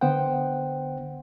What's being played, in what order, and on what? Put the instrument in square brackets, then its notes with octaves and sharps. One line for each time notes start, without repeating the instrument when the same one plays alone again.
[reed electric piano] D3 B3 C5 F#5 G5